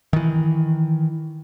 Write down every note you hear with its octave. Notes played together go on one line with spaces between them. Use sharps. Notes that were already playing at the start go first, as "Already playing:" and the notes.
D#3 E3